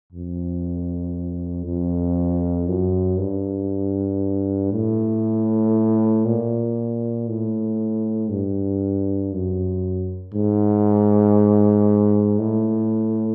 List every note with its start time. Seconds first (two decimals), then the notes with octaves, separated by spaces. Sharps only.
0.12 F2
1.65 F2
2.68 F#2
3.19 G2
4.72 A2
6.25 A#2
7.28 A2
8.29 G2
9.32 F#2
10.34 G#2
12.39 A2